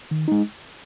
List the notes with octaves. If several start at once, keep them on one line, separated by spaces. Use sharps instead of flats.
D#3
G#3 D#4